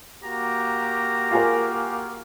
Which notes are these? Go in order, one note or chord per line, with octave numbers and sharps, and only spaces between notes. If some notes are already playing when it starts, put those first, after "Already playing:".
A#3 F#4 G4 A#5
F4 G#4 A#4